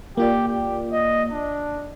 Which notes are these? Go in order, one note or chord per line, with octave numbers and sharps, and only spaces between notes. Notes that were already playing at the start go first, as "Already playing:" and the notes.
A#3 F4 G4 D5
G4
D#5
D4